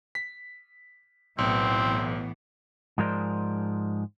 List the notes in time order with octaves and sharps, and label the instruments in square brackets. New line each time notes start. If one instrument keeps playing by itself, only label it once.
[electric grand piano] B6
[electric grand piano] B1 [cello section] A2 E3 B3 [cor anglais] C4
[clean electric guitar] G#2 F3 G#3 A#4 C5 D5